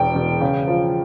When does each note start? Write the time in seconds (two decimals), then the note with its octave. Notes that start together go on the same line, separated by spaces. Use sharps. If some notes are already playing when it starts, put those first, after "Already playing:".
Already playing: E1 E2 B2 G5
0.15 E1
0.41 C#3
0.68 F3